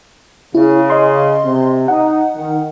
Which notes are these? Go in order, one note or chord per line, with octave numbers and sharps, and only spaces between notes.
C#3 E4
D#5 C6
C3
D#4 F#5
D#3